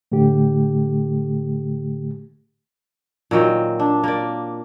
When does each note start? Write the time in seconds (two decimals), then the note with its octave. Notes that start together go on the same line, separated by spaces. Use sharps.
0.12 A2 D3 A3 G4
3.31 A#2 D#3 F#3 C4
3.80 D4
4.04 A#3 D5